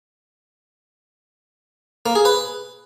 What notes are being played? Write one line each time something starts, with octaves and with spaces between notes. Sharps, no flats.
A#3
G#4
B4